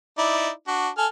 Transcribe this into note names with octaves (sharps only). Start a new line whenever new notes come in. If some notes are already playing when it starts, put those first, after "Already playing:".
D#4 E4 D5
D4 F#4
A4 G#5 F6